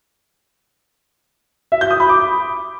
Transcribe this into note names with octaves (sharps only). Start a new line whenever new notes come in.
E5
G6
D#6
B5
D6